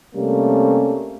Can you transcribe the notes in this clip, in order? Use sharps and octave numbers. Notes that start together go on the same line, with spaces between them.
C3 G3 A3 A#3 C#4